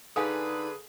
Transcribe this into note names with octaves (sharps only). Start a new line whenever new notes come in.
D3 D#4 G#4 A4 B4 F5 G#5 D#6